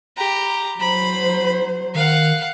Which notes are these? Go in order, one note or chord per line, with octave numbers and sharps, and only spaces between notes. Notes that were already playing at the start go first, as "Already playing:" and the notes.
G4 A#5 B5
F#3 C5 A#5 B5
D#3 F5 F#5